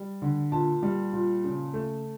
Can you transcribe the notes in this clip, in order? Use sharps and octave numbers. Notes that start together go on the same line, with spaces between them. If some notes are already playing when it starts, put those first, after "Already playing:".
Already playing: G3
D3
A#2 A5
G3
A#2
C#3
A3